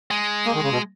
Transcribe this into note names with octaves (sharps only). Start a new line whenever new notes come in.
G#3
A#3
D#3
C#3
B2